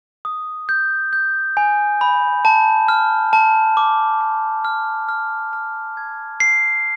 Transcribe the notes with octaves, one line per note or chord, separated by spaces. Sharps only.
D#6
G6
G6
G#5
B5
A5
F6
A5
D6
D6
F6
F6
F6
G#6
C7